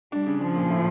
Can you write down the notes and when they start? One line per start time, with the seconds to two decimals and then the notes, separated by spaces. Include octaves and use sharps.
0.12 G3 D4
0.26 C#3
0.41 F3 D4
0.56 A#2
0.70 A2